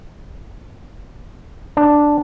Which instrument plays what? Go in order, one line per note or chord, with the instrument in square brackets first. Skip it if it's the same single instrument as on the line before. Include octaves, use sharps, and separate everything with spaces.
[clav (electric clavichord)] D4